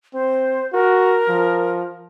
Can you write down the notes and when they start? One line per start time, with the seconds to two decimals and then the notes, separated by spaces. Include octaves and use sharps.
0.14 C4 C5
0.73 F#4 A#4
1.29 F3